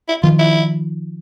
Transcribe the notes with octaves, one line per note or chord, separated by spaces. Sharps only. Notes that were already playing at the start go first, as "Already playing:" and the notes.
E4
D#3 F3 F4
E4